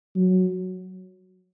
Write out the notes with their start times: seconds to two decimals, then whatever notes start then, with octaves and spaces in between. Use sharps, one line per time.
0.16 F#3